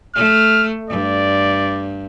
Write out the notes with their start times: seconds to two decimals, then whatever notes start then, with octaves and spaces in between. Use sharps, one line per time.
0.15 A3 F6
0.90 G2 D5